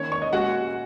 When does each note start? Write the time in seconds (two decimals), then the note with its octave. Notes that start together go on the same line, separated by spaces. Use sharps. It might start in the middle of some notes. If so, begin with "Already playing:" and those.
Already playing: D#3 A#3 C#4 C#5
0.12 C#5 C#6
0.22 D#5
0.33 A#2 G#3 C#4 F#4 F#5